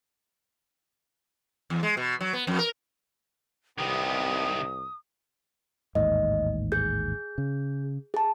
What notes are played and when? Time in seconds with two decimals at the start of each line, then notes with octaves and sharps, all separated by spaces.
1.70 E2
1.83 G#3
1.97 B2
2.21 F#3
2.33 B3
2.47 F2
2.59 A#4
3.78 C2 C3 D#3 B3 G4 D#6
5.95 A1 D#2 G#2 D#5
6.72 G#4 G6
7.38 C#3
8.14 G#4 A5